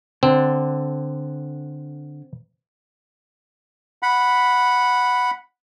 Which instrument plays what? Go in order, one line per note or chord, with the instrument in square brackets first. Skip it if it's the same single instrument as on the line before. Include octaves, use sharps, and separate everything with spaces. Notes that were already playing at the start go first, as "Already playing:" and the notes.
[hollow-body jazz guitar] D3 [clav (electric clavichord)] C4
[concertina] F#5 B5